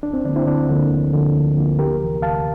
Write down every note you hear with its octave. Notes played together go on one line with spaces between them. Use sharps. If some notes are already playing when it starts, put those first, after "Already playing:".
D2 D4
C4
D3 F3 A#3 D4
C4 E4
D2 D4
D3 F3 A#3
D2
D3 F3 A#3
D2
D3 F3 A#3
D2 G4 A#4
C3 E3 A#3
D2 F5 A5